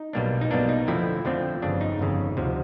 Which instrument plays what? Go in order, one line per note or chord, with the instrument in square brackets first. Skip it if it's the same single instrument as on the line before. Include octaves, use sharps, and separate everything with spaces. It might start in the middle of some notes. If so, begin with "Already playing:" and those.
Already playing: [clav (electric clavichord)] D#4
B1 B2 G3 A#3 D4
D#4
B1 B2 G3 A#3 D4
D#4
F2 D3 F3 A3 C4 E4
F2 D3 F3 A3 C4
G1 F2 C#3 D4
D#4
G1 F2 C#3
D2 C3 F3